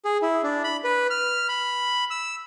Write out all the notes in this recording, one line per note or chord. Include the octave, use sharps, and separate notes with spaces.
G#4
E4
D4
B5
B4
F6
B5
E6